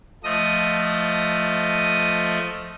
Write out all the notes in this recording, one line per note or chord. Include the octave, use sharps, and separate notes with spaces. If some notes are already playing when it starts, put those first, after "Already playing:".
F3 A3 D#5 D#6